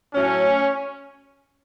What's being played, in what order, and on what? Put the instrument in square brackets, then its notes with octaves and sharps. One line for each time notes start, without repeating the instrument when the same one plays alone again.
[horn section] A2 F#3 A3 C#4